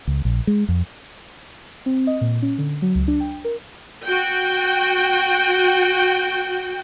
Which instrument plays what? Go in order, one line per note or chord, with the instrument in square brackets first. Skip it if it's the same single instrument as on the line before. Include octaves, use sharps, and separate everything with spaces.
[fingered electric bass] C#2
A#1
G#3
F2
[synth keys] C4
D#5
A#2
C#4
D3
F#3
C#2
D4
G5
A#4
[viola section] F#4 G5